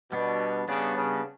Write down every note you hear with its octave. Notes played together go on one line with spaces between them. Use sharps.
B2 G3 B3 D4
C#3 G3 B3 D4
C#3